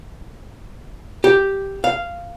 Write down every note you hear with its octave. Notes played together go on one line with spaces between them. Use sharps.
G4
F5